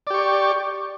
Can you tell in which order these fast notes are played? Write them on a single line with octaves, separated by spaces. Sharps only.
D5 G4 C#6